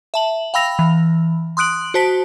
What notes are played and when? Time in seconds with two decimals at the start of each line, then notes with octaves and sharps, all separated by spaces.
0.14 E5 A5 F#7
0.54 F5 G5 B5 E6 A#6 F7
0.79 E3
1.57 C6 D#6 F#6 D7 F#7
1.94 F#4 C5 A5 B6 D7